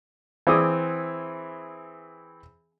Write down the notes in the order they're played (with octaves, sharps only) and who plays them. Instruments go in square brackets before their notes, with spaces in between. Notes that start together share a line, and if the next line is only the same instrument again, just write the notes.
[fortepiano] E3 C4 G#4 D6 D#6